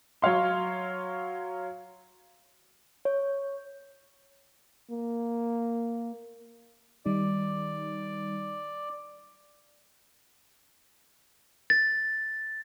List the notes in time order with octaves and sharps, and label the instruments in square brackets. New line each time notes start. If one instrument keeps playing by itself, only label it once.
[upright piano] F#3 C#5 F5 C6
[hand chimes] C#5
[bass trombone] A#3
[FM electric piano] D#3 G3 D#4 [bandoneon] D5
[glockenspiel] A6